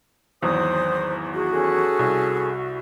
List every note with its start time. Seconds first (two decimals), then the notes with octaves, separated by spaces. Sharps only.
0.42 G#1 E2 F#3 C5 D#6
1.34 F#4 G#4
1.51 C#4 G#4 A4
1.99 C2